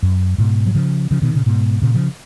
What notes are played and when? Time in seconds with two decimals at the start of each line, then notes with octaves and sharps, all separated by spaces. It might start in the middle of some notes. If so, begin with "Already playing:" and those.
0.03 F#2
0.38 G#2 B2
0.66 F#3
0.75 C#3 F3
1.11 C#3 F3
1.22 B2 D#3
1.34 A#2 C#3
1.46 G#2 B2
1.82 A#2 C#3
1.94 C#3 F3